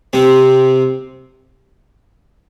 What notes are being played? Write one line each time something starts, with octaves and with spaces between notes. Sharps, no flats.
C3 C4